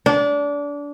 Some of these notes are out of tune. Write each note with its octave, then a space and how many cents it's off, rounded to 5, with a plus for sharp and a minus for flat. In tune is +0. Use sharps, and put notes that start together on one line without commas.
D4 -25